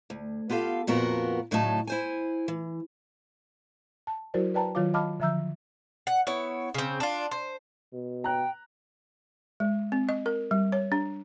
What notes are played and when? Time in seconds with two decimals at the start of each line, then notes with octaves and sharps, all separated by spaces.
0.10 D2
0.50 B3 F4 G4 A4 F5
0.87 F2 A#2 B3 F#4 A#4
1.51 D2 A2 C#3 F#3 D#4 A5
1.87 E4 C5 G#5
2.48 E3
4.07 A5
4.34 F#3 E4 F#4 A#4 C5 D5
4.54 B4 D5 G5 A5 A#5
4.75 D#3 F#3 F4 C#5 F5 D6
4.94 D#5 F5 A5 B5 D6 F6
5.20 D3 F3 E5 A#5 E6 G6
6.07 F#5
6.27 B3 E4 C#5
6.74 C#3 C4
7.00 D4 F4
7.31 C5
7.93 B2
8.24 G5 A#5 F#6
9.60 G#3
9.92 C4
10.09 D#5
10.26 A#4
10.51 G3
10.72 C#5
10.92 D4